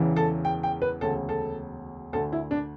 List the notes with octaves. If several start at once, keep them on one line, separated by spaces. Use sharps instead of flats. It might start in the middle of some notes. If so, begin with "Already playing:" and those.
Already playing: E1 E2 C#3 E3
A4
G5
G5
B4
E1 D2 C#3 A4
A4
D2 D3 A4
E4
D4